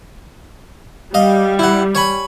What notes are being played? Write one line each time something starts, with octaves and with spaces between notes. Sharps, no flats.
G3 D#5 F5
E4 F#5
C#5 G#5 B5